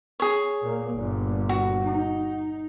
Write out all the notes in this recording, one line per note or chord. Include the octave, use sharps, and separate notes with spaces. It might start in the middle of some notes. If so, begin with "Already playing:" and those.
G#4 C#5
A#2 A#3
G1 A#2
F#4
D#4